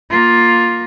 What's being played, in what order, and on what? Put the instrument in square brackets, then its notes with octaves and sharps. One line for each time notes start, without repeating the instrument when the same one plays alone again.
[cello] A#3 F4